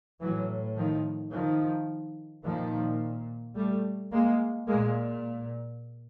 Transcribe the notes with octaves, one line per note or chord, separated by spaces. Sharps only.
A2 E3 F#3
D#3 F3
D#3 F3
A#2 D#3 F3
G3 A3
G#3 A#3
A#2 G#3 A#3